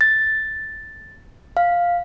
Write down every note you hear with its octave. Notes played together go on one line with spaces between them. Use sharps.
A6
F5